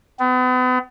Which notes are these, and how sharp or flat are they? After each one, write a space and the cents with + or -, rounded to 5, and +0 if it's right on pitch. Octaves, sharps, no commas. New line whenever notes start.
B3 +40